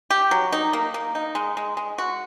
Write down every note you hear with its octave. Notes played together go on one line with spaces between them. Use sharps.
G4
F#3
D#4
A#3
A#3
D#4
G#3
G#3
G#3
F#4